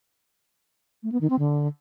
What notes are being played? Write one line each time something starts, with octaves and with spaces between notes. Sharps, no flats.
A3
B3
D#3
C4
D3